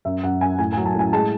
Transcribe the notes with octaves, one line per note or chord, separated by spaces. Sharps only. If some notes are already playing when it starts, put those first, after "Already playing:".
F#2 E5
F#2 F#5
F#2 G#5
A2 G#5
F#3 G#5
A5
A2 G#5
G#3 A5